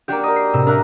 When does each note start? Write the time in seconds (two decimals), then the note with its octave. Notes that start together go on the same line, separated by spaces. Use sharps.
0.08 A#3 D4 F#4 G4 G5
0.24 A#4 D#5
0.36 C7
0.53 A2 C3 E6
0.67 D4 A#4 E5 F#5